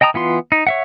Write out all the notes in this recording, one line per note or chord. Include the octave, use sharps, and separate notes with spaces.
D#5 G5 A5 A#5 D#6
E3 B3 F4 C6
D#4
C#5 E5 F#5